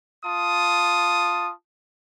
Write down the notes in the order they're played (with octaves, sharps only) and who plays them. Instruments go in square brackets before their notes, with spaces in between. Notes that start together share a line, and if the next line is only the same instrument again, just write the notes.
[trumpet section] F4 A5 D#6